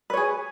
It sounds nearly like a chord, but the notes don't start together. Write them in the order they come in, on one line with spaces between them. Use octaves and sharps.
B4 C#5 G#4